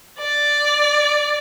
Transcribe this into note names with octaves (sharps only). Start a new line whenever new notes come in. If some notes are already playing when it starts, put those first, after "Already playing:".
D5